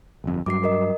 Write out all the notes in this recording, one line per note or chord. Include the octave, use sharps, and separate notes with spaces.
G1 F2
G2 F#3 D6 C7
A#4 D#5